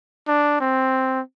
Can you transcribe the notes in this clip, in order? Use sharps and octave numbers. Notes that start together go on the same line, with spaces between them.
D4
C4